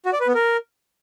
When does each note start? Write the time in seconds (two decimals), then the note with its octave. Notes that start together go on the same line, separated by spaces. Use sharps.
0.06 F#4
0.13 D5
0.20 B4
0.27 B3
0.35 A#4